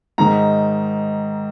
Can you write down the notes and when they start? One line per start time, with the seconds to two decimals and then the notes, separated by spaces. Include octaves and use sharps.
0.18 G#2 D#3 A#5